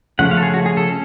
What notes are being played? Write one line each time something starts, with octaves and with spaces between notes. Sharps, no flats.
C#3 F3 A3 C#4 F#5
F5
A4
G#4
F#4
G#4
A4
C#4